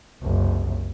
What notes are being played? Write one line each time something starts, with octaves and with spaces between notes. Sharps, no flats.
F#1 C2